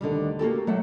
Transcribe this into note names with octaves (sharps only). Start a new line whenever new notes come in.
D2 D3 D#3 G3
A#3 F#4 G4 A4
F#3 A3 F#5